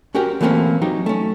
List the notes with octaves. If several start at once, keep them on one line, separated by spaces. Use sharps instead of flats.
C#4 F#4 G4 A#4
E3 A3 A#3 C4 C#4
F#3 D#4 G4
A3 C#4